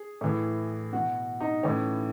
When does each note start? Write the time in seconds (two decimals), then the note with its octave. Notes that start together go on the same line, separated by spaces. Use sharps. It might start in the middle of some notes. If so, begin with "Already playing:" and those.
Already playing: G#4
0.21 A2 E3
0.93 B2 F#4
1.40 D#4
1.63 A2 E3 C#4